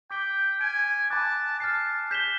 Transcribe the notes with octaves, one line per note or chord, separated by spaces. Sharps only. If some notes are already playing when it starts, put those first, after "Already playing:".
G5 D6 G6 B6 D7 G7
G#5 F6 A6 D7
G#5 A5 B5 D6 F#6
A5 F6 A6 C7
G6 B6 E7 G7